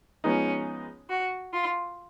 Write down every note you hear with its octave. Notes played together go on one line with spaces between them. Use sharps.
F3 G#3 B3 C#4 D#4
F#4
F4